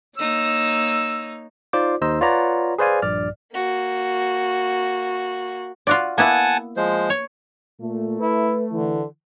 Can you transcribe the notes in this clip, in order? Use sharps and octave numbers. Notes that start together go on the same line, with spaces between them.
A#3 D#4 C#5 E6
D#4 F4 C5 D5 D6
D#2 D#4 C5 D#5 E6
F4 B4 C#5 D5 F#5 A#5
G#4 B4 C5 D5 F5 G#5
A#1 G2 D5 F6
A#3 F#4
F4 F#4 D5
A#3 B3 E4 F#5 G#5 A5
F3 G#3 C5
C#5
A#2 A3
E4 B4
D3 E3